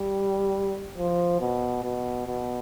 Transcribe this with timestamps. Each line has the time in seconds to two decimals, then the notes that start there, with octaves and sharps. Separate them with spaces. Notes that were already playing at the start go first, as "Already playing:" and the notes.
Already playing: G3
0.97 F3
1.41 B2
1.83 B2
2.27 B2